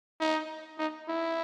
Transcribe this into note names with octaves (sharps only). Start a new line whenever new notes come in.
D#4
D#4
E4